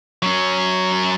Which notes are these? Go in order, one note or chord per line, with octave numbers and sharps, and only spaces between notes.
F#3 C#4